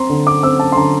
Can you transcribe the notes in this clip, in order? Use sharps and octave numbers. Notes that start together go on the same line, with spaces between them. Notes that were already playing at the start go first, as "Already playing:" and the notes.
Already playing: C4 A#5 C6
D3
D6
C4 E6
A5
C6
D3 A#5